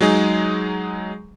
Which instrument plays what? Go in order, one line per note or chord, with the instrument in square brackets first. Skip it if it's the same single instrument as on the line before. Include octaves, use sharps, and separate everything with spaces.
[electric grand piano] F#3 G#3 D#4 G#4